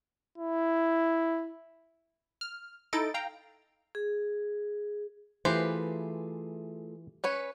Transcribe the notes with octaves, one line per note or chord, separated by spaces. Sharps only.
E4
F6
D#4 E4 A4 D#5 A6 D7
F5 G5 A#5
G#4
E3 A3 F4 G4 G#4 B4 C5
C#4 B4 C#5